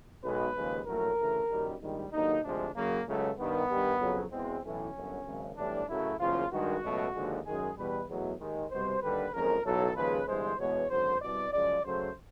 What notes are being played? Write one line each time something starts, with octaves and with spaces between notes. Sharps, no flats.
B1 B2 G#3 B4
D#2 C#3 F3 G#3
A#1 A2 F#3 A3 A#4
D2 C#3 E3 A3
F#1 F#2 D#3 G3
A#1 G#2 D#3 G3
D#2 D3 F#3 D#4
D2 C3 F3 G#3 D4
F#2 C#3 F#3 A#3
C#2 C#3 F#3 A3
G2 D#3 G3 B3
G2 D#3 G3
F2 C#3 F#3
E2 B2 G#3 C4
B1 A2 E3 C#4
G1 F#2 D3 F#3
G#1 F#2 C#3
B1 A2 E3 G3 D4
F#2 C#3 F#3 A3 E4
F#1 E2 C#3 F3 F4
G2 D#3 G#3 F#4
C#2 B2 F#3 A3
D#2 D3 F3 G#3
F#2 D#3 G#3 G#4
E2 B2 G3 B4
E2 B2 F#3 A3
D#2 D#3 G#3
C2 B2 G3 C5
D#2 D3 G3 B4
F#1 F2 C#3 F3 G#3 A#4
B1 A2 F#3 A4
D#2 C#3 F3 G#3 B4
G1 G2 E3 G#3 C5
E2 B2 G#3 C#5
G#1 F#2 D3 F#3 C5
C2 B2 G3 D5
F#2 C#3 F3 G#3 D5
F#2 C#3 F#3 A3 C5